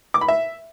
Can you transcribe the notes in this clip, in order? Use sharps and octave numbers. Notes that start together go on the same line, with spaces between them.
D6
B5
E5